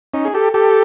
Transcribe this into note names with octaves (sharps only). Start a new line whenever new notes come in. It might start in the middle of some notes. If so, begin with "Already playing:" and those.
C#4 D#4
G#4
G4 A4
G4 A4